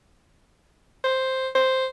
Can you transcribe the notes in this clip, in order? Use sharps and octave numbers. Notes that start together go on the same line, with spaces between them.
C5
C5